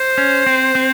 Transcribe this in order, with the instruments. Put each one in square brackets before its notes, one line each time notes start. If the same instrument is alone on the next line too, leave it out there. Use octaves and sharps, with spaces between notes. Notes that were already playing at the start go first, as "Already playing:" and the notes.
Already playing: [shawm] C5
[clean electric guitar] C#4
C4
C4